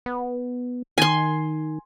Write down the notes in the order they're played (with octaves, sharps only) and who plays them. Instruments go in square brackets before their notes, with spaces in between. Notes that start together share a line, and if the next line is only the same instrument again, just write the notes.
[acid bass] B3
[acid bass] D#3 [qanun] G#5 C6